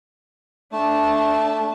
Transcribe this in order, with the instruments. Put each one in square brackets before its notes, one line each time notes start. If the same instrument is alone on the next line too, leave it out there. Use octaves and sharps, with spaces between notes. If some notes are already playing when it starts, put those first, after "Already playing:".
[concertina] A3 [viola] D4 A5